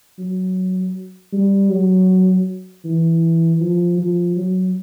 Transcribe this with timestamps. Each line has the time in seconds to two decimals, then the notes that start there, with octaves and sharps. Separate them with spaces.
0.18 F#3
1.33 G3
1.70 F#3
2.85 E3
3.60 F3
3.98 F3
4.37 F#3